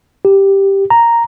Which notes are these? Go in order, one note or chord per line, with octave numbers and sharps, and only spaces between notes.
G4
A#5